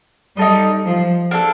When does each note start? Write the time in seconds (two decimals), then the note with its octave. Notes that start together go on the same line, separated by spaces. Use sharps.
0.37 G3 D#4 A4 D#5
0.85 F3
1.31 A#3 D4 A4